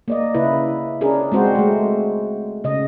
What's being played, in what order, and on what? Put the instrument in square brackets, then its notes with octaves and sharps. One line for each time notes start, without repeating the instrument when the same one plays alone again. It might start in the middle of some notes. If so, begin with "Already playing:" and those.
[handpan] A#3 D5 D#5
C#3 E4 B4
C#4 D4 G#4 A#4
G#3 C4 F#4 C5
G#3 A3
C#3 D#5